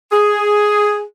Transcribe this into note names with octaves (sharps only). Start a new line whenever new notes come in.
G#4